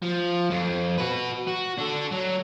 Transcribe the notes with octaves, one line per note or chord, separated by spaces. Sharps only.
F3
F2
F#4 B4
F#4
D4 A4
F#3